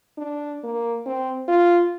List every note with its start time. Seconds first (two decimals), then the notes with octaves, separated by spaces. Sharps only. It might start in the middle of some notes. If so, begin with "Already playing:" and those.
0.18 D4
0.64 A#3
1.06 C4
1.48 F4